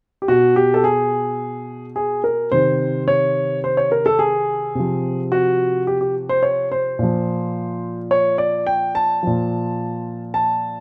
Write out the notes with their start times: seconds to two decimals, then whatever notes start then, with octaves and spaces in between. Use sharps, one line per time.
0.22 G4
0.28 B2 F#4
0.56 G4
0.74 A4
0.84 G#4
1.96 G#4
2.24 A#4
2.52 C3 D#3 C5
3.08 C#5
3.64 C5
3.77 C#5
3.92 A#4
4.06 A4
4.19 G#4
4.75 C3 F3
5.32 F#4
5.87 G4
6.01 G4
6.29 C5
6.43 C#5
6.72 C5
6.99 A#2 F3
8.11 C#5
8.38 D5
8.67 G5
8.95 A5
9.23 A#2 F3
10.34 A5